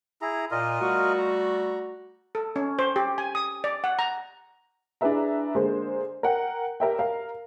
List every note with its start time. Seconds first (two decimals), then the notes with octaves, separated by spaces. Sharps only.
0.22 E4 G#4 A#5
0.51 A#2 F4 A#4 D#5
0.80 G3 A3 F#4
1.18 A#5
2.35 A4
2.56 C#4
2.79 C5
2.96 G4
3.18 G#5
3.35 D#6
3.64 D5
3.84 F#5
3.99 A#5
5.01 D4 E4 G#4 B4 E5 A#5
5.55 D3 G#3 A#3 C5
6.23 A#4 F#5 G5
6.80 G4 A#4 E5 G5
6.99 A#4 F5